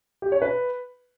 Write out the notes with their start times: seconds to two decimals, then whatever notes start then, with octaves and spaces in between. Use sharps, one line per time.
0.22 G4
0.32 C#5
0.42 B4